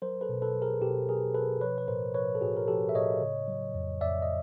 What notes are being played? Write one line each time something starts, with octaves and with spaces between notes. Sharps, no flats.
F#3 A#4 C5
A4 B4
B2
A4 B4
F#3
G#4 A#4
B2 G4 A4
F#3 G#4 A#4
B2 A4 B4
F3 B4 C#5
B4
A2 A#4 C5
F3 B4 C#5
A4
A2 F#4 G#4
A#4
F3 G4 A4
E5
A2 C#5 D#5
C#3
F#3
F2
F2 D5 E5
D#5